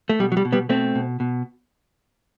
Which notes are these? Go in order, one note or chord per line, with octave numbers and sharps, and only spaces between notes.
A3
B2 G3
F#3
G3
B2
G3 B3
B2 A3 C4
B2
B2